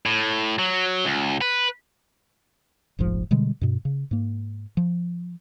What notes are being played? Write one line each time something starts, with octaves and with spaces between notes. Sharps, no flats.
A2
F#3
C#2
B4
F1 A#1 G#2 F3
B2 D3 G3 G#3
G2 B2
C#3
G#2 A#3
F3